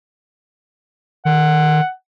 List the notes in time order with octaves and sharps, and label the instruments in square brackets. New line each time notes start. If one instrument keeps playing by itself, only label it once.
[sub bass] D#3 [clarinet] F#5